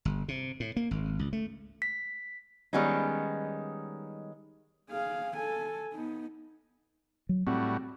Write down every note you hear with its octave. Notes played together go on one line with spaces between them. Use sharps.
G1
C3
A2
A#3
G#1
C#2
A3
B6
D#3 G3 G#3 B3 C#4 D#4
G#4 F5
A4 G#5
B3 D#4
F#3
A2 G3 C4 F#4